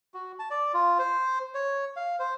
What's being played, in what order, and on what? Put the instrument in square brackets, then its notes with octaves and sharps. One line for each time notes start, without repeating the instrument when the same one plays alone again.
[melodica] F#4
A5
D5
F4
C5
C#5
F5
C5